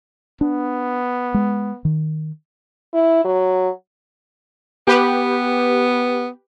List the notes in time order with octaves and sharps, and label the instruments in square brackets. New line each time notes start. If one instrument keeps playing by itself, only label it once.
[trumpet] B3 [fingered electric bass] D4
[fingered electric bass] G#3
D#3
[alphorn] E4
F#3
[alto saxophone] B3 [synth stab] G4 B4